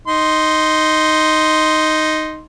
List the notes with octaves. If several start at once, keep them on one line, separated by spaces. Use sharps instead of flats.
D#4 C6